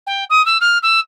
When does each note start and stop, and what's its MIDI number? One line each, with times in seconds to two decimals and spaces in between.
0.06 0.24 79
0.30 0.44 87
0.46 0.58 88
0.61 0.78 89
0.83 1.00 88